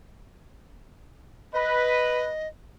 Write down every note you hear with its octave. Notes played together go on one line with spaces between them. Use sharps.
B4 D#5